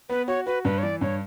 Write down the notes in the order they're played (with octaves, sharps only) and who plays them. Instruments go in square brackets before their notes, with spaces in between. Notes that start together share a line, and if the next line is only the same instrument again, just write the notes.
[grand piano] B3 [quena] B4
[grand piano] F#4 [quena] C#5
[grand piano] F#4 [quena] B4
[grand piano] G2 [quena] B4
[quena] C#5
[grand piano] E3 [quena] D5
[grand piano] G2 [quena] C#5